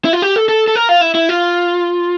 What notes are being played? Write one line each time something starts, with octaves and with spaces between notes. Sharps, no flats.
E4
F4
G4
A4
A4
A4
A#4
F4
E4
E4
F4